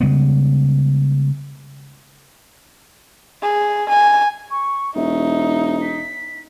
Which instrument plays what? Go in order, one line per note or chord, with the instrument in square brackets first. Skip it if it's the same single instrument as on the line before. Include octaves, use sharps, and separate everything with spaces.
[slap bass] C#3 G3 G#3 B3
[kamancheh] G#4
G#5
[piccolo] C#6
[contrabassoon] E1 [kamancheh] D#4 [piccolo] E5
[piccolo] B6